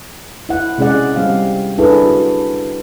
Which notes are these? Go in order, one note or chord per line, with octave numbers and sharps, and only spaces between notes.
E4 F#5
C3 G#3 C#4 G#4 D5 F#5
G3 C4 F5
D4 E4 G#4 A4 B4
F#4